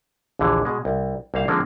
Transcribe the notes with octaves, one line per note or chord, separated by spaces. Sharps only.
A#1 D#2 D3 E3
B2 G#3
C2
C2 A#3 C5 F5
D3 F3 G#3 A#3 C4 C#4